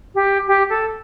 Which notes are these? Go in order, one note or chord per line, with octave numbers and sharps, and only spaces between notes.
G4
G4
A4